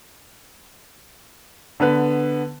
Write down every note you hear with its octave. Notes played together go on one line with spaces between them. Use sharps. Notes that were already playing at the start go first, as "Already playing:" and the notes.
D3 B3 B4